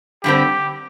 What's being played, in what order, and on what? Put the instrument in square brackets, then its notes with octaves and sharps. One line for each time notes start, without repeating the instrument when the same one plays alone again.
[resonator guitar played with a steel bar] G2 D3 G3 C4 [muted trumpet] G4